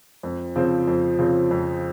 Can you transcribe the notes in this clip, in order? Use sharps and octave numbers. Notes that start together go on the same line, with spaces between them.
F2
C#3 F3 C4
F2
C#3 F3 C4
F2